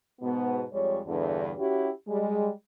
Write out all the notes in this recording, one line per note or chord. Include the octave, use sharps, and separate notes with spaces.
G#2 B2 B3
F2 G3 G#3 C#5
E2 G2 D3
C#4 E4 F#4 G4
G3 G#3